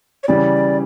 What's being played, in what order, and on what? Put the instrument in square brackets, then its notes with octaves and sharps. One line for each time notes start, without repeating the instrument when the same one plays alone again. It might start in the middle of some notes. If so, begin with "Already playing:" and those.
[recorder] C#5
[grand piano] C#3 E3 G3 [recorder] D5